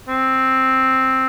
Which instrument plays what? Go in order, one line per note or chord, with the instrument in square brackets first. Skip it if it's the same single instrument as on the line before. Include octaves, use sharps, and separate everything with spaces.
[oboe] C4